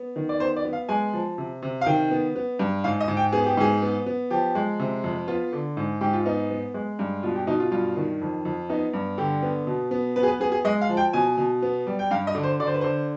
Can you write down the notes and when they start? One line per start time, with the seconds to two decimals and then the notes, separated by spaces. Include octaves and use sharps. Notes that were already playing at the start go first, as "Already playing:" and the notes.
Already playing: B3
0.16 D#3
0.29 D5
0.40 B3 C5
0.56 D5
0.65 B3
0.73 F5
0.89 G#3 G#5
1.13 F3
1.38 C3
1.62 C3
1.81 F5
1.86 D#3 G5
2.11 B3
2.36 B3
2.59 G2
2.84 G#2 F5
3.00 D#5
3.08 G#2
3.17 G5
3.32 B3 G#4
3.46 G4
3.57 G#2 G#4
3.82 B3
4.06 B3
4.31 F3 G4
4.55 G#3
4.80 C3
5.04 F2
5.27 B3 F4
5.53 D3
5.77 G#2
6.01 G#2 G4
6.13 F4
6.26 B3 D#4
6.50 B3
6.74 G#3
6.99 G2
7.23 B2 F4
7.35 G4
7.47 B2 D#4
7.60 F4
7.71 G2 F4
7.96 D#3
8.21 F2
8.45 F2
8.70 B3 D#4
8.94 G2
9.18 D3 G4
9.42 B3
9.67 B2
9.91 B3
10.16 B3 B4
10.23 G#4
10.28 B4
10.40 B3 G#4
10.52 G#4
10.65 G#3 D#5
10.81 F5
10.89 F3
10.97 G5
11.13 B2 G#5
11.38 B2
11.62 B3
11.87 G3
11.99 G5
12.11 G2 F5
12.27 D#5
12.35 D3
12.43 C5
12.60 D3 D5
12.67 C5
12.74 B4
12.81 D3 C5